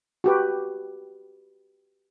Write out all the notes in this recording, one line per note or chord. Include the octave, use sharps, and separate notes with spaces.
F#4 G4 B4